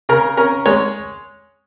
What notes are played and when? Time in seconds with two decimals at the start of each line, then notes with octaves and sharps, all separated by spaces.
0.09 C#3 A#4
0.37 C#4 A#4
0.66 G#3 C#5